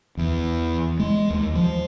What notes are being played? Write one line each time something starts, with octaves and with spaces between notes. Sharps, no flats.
E2
G#3
D#2
F3